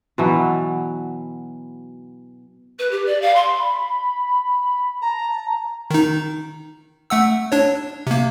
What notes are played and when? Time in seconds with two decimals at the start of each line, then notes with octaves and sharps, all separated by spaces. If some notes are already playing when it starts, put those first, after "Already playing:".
0.18 B2 E3 F#3
2.79 B4
2.91 G4
3.06 D5
3.21 F5
3.35 C6
3.60 B5
5.02 A5 A#5
5.90 D#3 D#4
7.10 A3 F#5 E6
7.52 D4 C#5
8.07 C3 A#3